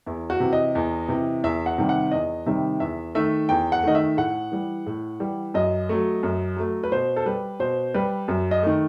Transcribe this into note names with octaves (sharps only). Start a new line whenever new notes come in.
E2 E4
F#4
C3 E3
D#5
E2
C3 E3
E2 E5
F#5
C3 D#3 G3
F#5
E2 D#5
C3 D#3 G3 E5
E2 E5
D#3 A3 E5
E2 G5
F#5
D#3 A3 D#5
E5
A2 F#5
E3 G3
A2
E3 G3
F#2 D#5
F#3 A3
F#2
F#3 A3
B4
B2 C5
A4
G3 B4
B2 C5
G3 B4
F#2
D#5
D#3 A3